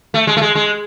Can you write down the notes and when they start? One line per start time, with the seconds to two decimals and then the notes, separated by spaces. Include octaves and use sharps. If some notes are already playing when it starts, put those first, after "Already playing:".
0.14 A3
0.27 G#3
0.37 A3
0.41 G#3
0.55 G#3